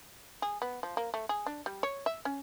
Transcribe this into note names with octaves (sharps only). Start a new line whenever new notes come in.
G#4
B3
F3
A#3
A3
G#4
D4
G3
C#5
E5
C#4